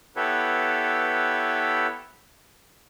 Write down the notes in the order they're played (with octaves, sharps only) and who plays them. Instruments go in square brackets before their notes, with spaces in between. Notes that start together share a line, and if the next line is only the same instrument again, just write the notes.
[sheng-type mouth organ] B3 E4 G4 A4 B4 C#5